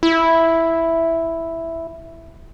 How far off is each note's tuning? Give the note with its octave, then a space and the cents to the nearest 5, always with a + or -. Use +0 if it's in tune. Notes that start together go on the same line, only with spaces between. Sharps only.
E4 +0